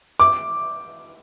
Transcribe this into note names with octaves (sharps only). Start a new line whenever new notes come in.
D6